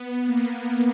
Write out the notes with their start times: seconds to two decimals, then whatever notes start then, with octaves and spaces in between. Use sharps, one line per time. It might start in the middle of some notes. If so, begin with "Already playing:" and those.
Already playing: B3
0.26 A#3